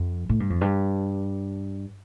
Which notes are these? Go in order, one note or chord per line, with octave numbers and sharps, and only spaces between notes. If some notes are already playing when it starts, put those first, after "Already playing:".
Already playing: F2
A2
G2
F2
G2